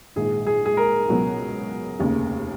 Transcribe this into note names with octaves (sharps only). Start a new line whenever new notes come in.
A#1 G#2 D#3 G#3 G#4
G#4
G#4
A#4
C#2 B2 F#3 B3
F1 D#2 C#3